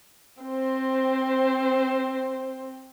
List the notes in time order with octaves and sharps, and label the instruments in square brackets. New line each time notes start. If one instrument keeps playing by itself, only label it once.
[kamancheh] C4 C5